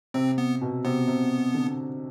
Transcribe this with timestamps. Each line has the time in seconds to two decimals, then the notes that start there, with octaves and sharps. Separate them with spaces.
0.14 C3 C4
0.38 B3
0.61 B2
0.85 C3 B3
1.08 C3
1.55 D3